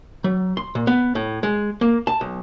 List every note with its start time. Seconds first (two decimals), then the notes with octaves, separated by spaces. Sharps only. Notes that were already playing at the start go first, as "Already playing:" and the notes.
0.24 F#3
0.57 C6
0.75 A#2
0.87 B3
1.15 A2
1.43 G#3
1.81 A#3
2.07 A5
2.21 B1